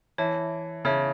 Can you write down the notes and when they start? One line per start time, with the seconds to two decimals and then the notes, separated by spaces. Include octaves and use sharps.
0.18 E3 C#5 E5 A5
0.85 C#3 C#5 E5 A5